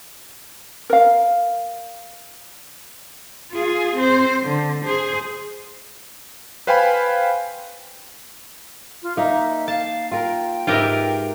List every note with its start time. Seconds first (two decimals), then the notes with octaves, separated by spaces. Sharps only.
0.90 A#4 F5
3.51 F4 G#4
3.96 C4 C5
4.43 D3
4.84 G#4 C5
6.67 B4 C5 F5 G5 G#5 B5
9.03 F4
9.17 A#3 D#4 E5
9.68 F5 A5
10.11 F4 A#4 G5
10.67 G#2 F4 G4 A#4 B4 E5